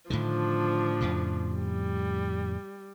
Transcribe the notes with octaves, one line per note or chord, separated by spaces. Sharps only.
A2 D3 D#3 F3 D4
F2 A2 C#3
G3